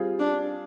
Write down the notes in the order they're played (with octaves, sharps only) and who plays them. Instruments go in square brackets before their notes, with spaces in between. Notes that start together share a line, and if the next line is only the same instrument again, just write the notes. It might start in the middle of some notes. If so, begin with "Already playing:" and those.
Already playing: [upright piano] G3 C4 F4 G#4
[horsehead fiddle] D4